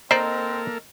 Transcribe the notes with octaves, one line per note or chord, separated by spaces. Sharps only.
A#3 C4 D#4 A4 A#4 C5 D5